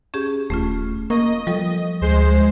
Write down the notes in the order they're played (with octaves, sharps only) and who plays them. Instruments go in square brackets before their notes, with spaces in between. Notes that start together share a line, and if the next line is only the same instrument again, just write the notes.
[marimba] C#4 G4 G#4
[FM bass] D#1 [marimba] A3 C#4 F4
[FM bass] A#3 [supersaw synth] D#5 [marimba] C#6 A#6
[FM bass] F3 [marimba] G3 A4
[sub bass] D2 [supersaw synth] G#3 C5 C6